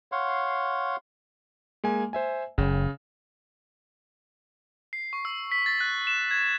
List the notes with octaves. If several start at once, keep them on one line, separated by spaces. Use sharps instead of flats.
C#5 F5 F#5 C6
G#3 A#3 G#5
C5 E5 G#5
F#1 C#3
C7
C#6
E6
B6
A6
F#6
E7
G#6